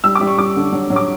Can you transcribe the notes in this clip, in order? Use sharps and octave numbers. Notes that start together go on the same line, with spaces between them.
G3 E6
D6
G3
C#6
G3 D6
D3
F#3
F#3
D6